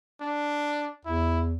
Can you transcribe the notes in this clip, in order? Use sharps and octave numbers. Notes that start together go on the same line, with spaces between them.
D4
E2 E4